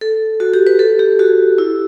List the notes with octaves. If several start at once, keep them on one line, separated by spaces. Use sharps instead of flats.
A4
F#4
G4
B4
A4
G4
F#4
E4